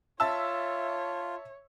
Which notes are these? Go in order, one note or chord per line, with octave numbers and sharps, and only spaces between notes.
F4 C#5 E5 A5 E6